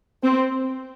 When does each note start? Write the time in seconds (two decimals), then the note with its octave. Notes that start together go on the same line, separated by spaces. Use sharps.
0.23 C4